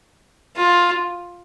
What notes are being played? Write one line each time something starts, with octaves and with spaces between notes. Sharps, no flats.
F4